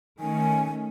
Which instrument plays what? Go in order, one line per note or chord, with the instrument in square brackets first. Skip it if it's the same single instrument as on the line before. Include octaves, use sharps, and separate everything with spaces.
[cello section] D#3 A3 C#4 [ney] G#5